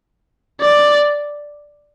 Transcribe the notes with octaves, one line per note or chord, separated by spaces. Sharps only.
D5